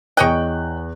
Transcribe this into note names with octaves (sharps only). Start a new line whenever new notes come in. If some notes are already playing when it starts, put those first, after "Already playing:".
E2 C#5 D#5 G5 F#6